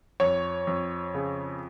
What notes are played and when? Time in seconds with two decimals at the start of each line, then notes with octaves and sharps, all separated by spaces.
0.20 F2 C#5
0.67 F2
1.15 C#3